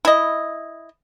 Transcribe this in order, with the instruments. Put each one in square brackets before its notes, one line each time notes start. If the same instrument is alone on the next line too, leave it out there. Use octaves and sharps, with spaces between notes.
[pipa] E4 D#5